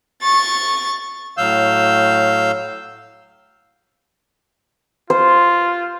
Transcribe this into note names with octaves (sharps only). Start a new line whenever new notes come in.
C#6 A6
A2 F#3 F5 E6 G6
F4 C5